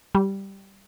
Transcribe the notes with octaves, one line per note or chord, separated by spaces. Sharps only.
G3